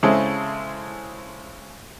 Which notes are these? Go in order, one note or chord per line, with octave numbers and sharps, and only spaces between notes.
C#3 G#3 C4 E4 A4